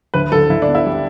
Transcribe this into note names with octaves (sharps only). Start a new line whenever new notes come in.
D2 B4
D3 A4
D3 E4
D4
B3
E4
G3